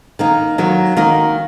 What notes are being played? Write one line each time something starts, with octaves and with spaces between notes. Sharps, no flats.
D#3 A#3 D#4
D#3 F#3 A#3
D#3 A#3 D#4 F#4